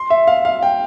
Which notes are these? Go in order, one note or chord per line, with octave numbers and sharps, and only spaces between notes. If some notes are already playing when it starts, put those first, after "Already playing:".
Already playing: C6
E5
F5
F5
G5